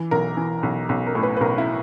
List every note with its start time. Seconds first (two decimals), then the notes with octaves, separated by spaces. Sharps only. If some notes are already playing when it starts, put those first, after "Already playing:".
Already playing: E3
0.11 B1 A#4
0.37 E3
0.63 B1
0.89 B1
1.07 A#4
1.15 A2
1.23 B4
1.37 B4
1.41 B1 A#4
1.58 E4